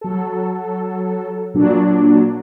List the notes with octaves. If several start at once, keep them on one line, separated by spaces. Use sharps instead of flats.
F#3 A4
A#2 F#3 D4